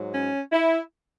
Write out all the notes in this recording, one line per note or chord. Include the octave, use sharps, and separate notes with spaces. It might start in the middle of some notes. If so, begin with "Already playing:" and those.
Already playing: G#2 F#3
C#4
E4